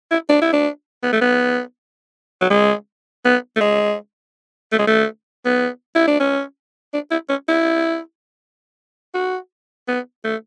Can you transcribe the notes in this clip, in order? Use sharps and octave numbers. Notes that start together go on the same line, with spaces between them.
E4
D4
E4
D4
B3
A3
B3
F#3
G#3
B3
A3
G#3
A3
G#3
A3
B3
E4
D4
C#4
D4
E4
C#4
E4
F#4
B3
A3